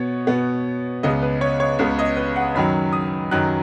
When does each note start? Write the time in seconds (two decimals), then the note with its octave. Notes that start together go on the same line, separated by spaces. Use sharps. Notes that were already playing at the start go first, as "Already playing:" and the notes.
Already playing: B2 B3 C#5
0.27 B2 B3
1.03 C#2 C#3 B3 D#5
1.22 B4
1.41 C#5
1.60 C#5
1.79 C#2 C#3 B3
1.99 D#5
2.17 B4
2.36 F#5
2.55 F#2 D#3 F#3 B5
2.93 D#6
3.31 F#2 D#3 F#3 F#6